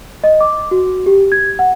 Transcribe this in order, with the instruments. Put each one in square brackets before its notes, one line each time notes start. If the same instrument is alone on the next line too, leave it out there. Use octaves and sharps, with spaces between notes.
[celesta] D#5
D6
F#4
G4
G#6
F#5